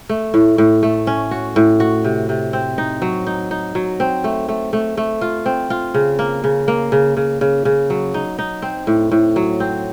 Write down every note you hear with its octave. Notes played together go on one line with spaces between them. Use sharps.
A3
A2
A2
A3
C#4
F#4
A2
F#4
C3
C3
C4
D#4
F#3
D#4
D#4
F#3
C4
A3
A3
A3
A3
F4
C4
F4
C#3
A#3
C#3
A#3
C#3
C#3
C#3
C#3
F#3
D#4
D#4
C4
A2
A2
F#3
C4